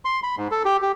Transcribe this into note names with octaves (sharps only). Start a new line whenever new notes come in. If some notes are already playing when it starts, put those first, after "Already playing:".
C6
B5
G#2
A4
G4
G4